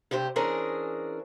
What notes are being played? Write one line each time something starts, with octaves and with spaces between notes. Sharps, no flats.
G2 C3 G4 C5
E3 C#4 D4 G#4 A#4 C5